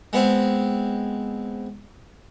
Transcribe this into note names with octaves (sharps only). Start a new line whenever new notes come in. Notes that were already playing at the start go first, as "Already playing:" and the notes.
G#3 B3 C4